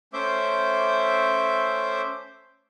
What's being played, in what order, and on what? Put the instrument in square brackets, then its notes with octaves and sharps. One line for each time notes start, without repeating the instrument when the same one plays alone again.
[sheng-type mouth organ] A3 C#4 C5 E5 D6 G6